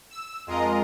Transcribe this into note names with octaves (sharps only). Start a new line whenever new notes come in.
E6
F2 G#3 F4 A#4 D#5 A#5